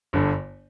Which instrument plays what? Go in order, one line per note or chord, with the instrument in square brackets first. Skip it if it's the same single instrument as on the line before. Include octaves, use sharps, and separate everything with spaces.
[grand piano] G1 G2 D3